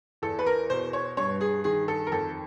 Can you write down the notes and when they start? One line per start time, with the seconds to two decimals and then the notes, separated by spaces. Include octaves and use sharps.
0.22 E2 A4
0.39 B4
0.46 A#4
0.70 B2 C5
0.93 C#5
1.17 G2 C#5
1.41 G#4
1.64 D#3 G#4
1.88 A4
2.06 A#4
2.12 F2 A4